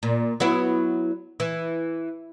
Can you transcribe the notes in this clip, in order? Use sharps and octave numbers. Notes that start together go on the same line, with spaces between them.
A#2
F#3 B3 E4
E3